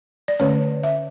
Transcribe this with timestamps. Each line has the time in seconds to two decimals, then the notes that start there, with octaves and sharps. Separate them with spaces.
0.28 D5
0.40 D3 A3 C#4 C#5
0.84 E5